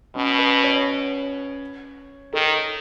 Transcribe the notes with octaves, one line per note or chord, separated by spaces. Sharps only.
B2 C#4
B4
C#5
D#3 A4